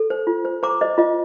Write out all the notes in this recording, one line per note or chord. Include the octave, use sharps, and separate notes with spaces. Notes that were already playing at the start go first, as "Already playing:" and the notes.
Already playing: A4
C5
F4
C5
C5 A#5 D6
C5 D#5
F4 D#5